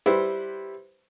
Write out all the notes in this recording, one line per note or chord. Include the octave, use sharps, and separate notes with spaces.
G3 E4 G4 B4 C5